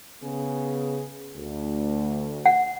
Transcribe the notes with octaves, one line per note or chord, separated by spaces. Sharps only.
C#3 B3 G#4
D2
F#5